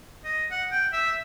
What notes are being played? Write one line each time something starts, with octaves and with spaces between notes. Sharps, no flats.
D#5
F#5
G5
E5